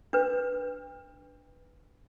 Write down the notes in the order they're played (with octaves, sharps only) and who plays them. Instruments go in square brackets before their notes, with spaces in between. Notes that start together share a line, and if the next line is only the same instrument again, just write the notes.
[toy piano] D4 B4